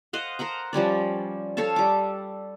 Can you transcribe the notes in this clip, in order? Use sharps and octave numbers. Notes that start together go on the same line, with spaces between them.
C5 D#5 F5 F#5
A#4 C5 F#5 A#5
F3 G3 C#4 D5
A4 C#5 F5 A5
G3 D6